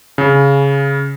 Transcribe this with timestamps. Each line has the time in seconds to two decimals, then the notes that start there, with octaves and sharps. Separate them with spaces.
0.18 C#3